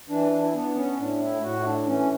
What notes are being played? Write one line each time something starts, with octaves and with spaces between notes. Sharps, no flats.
E3 D4
D4
E4
B3 D4
C#4
A2 D4
E4
A2 F#4
E4
D4
E3 C#4